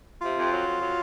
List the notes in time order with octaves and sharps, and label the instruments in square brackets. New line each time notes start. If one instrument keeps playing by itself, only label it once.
[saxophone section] C3 [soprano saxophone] F4
[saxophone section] F2
F#3
F2
F#3